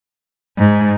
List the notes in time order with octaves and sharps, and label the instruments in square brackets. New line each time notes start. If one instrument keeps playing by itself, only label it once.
[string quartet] G#2